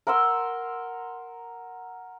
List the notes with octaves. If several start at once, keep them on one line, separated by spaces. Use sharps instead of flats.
A#4 F#5 C6 E6